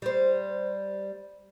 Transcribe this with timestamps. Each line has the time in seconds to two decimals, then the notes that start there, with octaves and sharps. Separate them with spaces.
0.02 G3 C5